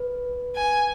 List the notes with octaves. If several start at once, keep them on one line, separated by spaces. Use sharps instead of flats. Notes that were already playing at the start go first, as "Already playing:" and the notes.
Already playing: B4
G#5